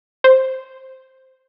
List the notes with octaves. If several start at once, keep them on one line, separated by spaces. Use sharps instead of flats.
C5